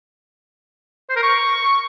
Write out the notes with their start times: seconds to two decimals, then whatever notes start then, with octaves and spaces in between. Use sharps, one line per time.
1.09 C5
1.16 A#4
1.23 C#6